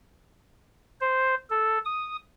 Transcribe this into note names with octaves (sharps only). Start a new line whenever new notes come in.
C5
A4
D#6